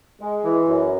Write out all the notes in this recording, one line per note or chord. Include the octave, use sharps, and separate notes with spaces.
G#3
E3
F#2